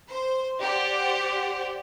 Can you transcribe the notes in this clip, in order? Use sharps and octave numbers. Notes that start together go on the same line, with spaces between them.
C5
G4 C5 D5 F#5